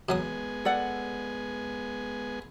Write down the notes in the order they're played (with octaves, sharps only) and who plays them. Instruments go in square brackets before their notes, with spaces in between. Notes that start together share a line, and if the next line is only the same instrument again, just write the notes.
[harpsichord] B2 F#3 D#6 [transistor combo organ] G#3 B3 G#5
[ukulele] A4 D5 F#5